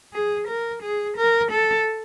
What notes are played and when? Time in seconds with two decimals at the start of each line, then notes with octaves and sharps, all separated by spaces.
0.13 G#4
0.48 A#4
0.83 G#4
1.17 A#4
1.51 A4